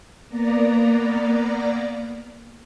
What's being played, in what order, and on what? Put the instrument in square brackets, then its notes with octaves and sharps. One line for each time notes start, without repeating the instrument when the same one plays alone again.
[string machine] A#3 B3 D5 A#5